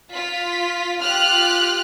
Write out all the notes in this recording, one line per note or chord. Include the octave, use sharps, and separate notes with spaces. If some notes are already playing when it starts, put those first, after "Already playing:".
F4 B6
F4 G4 F6 F#6